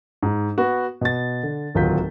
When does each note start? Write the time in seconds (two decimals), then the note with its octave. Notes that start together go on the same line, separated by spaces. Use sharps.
0.22 G#2
0.58 B3 F#4
1.01 B2 A6
1.43 D3
1.75 D1 D#2 F#3 F4 G6 B6